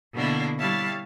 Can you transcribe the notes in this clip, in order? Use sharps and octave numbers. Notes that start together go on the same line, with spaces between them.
B2 D3 A#3 B3 D4 E4
G3 E4 C#5 F5 A5 A6